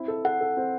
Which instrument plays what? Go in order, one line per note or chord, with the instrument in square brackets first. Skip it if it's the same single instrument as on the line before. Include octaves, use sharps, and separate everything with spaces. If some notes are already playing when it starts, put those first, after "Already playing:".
Already playing: [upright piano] C4 E4
A4
[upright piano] A4 [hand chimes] F#5
[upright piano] A4
C4